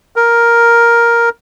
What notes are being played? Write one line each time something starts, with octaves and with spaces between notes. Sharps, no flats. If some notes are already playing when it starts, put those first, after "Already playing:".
A#4